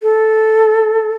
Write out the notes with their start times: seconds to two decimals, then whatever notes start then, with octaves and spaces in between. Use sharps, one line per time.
0.03 A4